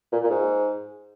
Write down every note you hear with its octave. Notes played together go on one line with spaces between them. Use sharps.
A#2
A#2
G#2